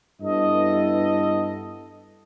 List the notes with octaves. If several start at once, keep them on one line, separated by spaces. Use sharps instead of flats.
G2 B3 E4 A4 D#5